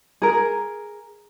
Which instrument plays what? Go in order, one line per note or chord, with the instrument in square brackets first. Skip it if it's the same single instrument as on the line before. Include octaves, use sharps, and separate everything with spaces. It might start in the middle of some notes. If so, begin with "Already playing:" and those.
[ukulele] G#4 A#4